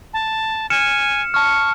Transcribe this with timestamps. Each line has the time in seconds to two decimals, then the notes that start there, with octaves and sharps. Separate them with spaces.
0.13 A5
0.70 G#5 F6 C#7 E7
1.34 A5 C#6 F6